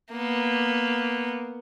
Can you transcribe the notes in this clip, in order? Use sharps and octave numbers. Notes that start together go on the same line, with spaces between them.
A#3 B3